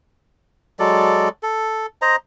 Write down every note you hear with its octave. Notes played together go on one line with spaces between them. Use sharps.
F#3 G#3 A4 D5
A4
C5 D#5 A#5